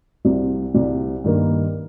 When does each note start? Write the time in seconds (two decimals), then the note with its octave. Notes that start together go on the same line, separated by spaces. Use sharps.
0.25 C2 C3 G3
0.74 C2 C3 G3
1.24 G2 D#3 A#3